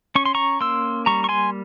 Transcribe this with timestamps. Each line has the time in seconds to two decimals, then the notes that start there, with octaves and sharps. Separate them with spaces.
0.15 C#4 C#6
0.26 C6
0.35 A#5 C#6
0.61 A#3 C6 E6
1.06 G3 A#5 C#6
1.24 C#6
1.29 G#5 C6